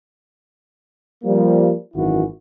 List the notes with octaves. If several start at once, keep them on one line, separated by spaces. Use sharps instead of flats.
F3 G3 A#3
G#1 F#2 D#3 E3 E4 F#4